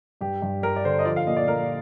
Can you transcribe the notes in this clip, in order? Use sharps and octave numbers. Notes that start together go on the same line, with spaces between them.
G2 G4
G2
G3 A#4
D5
D3 C5
D#5
F3 D5
F5
A#2 D#5
D5
A#2 A#4